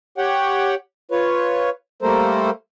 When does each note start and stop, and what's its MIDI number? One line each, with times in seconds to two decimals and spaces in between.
0.18 0.75 67
0.18 0.75 73
0.18 0.75 78
0.18 0.75 79
1.11 1.70 65
1.11 1.70 71
1.11 1.70 73
2.02 2.50 55
2.02 2.50 57
2.02 2.50 58
2.02 2.50 69
2.02 2.50 70
2.02 2.50 72